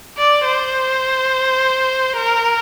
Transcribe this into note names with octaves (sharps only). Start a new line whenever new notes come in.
D5
C5
A#4